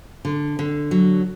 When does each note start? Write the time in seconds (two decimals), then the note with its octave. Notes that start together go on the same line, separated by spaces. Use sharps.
0.25 D3
0.59 D3
0.91 F#3